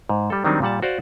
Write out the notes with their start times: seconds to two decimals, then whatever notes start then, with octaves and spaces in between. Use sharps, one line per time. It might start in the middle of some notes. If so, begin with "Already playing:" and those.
0.09 G#2
0.30 G3 A4
0.45 D#3 F#3 G3 C4 D4 D#4
0.62 A#2 G3 F#5 A5
0.82 F#4 C5 D5 F5